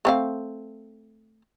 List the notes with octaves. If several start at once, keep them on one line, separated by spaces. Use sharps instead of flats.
A3 C4 F5